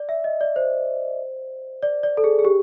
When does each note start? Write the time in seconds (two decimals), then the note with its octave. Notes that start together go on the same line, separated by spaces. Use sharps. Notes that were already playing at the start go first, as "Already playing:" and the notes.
Already playing: D5
0.09 E5
0.24 D#5
0.41 D5
0.56 C5
1.82 D5
2.03 D5
2.17 A4
2.24 G#4
2.39 G#4
2.45 G4